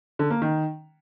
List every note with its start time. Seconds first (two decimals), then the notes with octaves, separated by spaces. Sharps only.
0.19 D3
0.30 A#3
0.42 D#3